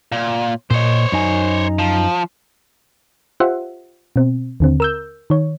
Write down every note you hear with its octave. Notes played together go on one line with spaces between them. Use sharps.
A#2
A#2 C5 C#5 D#5
F#2 D#4 G#5
F3
F4 G4 C5 E5 F#5
B2 C4
D#2 D3 C4
A#4 E6 G6
D#3 C#5